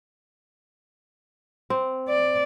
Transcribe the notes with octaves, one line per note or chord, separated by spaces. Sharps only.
C4
D5